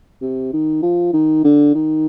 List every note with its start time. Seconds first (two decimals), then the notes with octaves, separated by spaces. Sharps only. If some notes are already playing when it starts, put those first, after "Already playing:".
0.21 C3
0.53 D#3
0.83 F3
1.13 D#3
1.44 D3
1.75 D#3